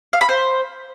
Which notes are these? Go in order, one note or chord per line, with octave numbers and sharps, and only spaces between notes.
F5
B5
C5